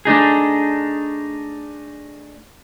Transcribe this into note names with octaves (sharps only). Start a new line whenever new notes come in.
A3 D4 D#4 G#4